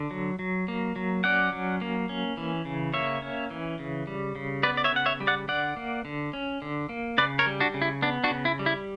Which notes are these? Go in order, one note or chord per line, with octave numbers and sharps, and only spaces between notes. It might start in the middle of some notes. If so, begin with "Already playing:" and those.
Already playing: D3
F#3
F#3
A#3
F#3
C#4 D5 F#5
F#3
A#3
C#4
E3
C#3
A#3 C#5 E5
C#4
E3
C#3
G3
C#3
B3 B4 D5
D5
C#5 E5
C#3 F#5
C#5 E5
G3
D5 F#5
D3 D5 F#5
A#3
D3
C#4
D3
A#3
C#3 B4 D5
A#4 C#5
G3
D4 F#4
C#3
E4
B3 D4
D4 F#4
C#3
E4
G3
E4